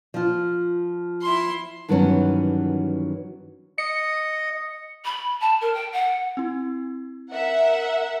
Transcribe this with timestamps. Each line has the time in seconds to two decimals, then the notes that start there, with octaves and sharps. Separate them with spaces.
0.14 F3 F4
1.23 E4 C6
1.89 G2 D#3 E3 F#3 B3 C#4
3.78 D#5 C#7
5.04 B5
5.40 A5
5.61 A#4
5.74 G5
5.92 F#5
6.37 C4 E4
7.31 A#4 E5 F#5